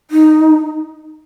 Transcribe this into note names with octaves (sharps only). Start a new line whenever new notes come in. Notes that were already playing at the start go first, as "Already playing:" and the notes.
D#4